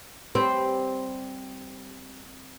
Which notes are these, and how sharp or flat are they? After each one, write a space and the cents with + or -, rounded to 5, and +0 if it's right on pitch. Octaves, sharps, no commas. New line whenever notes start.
G3 +0 C4 +0 B4 +0